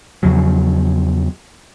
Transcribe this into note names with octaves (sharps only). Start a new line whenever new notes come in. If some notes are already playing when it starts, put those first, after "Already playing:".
E2 C#3 F3 F#3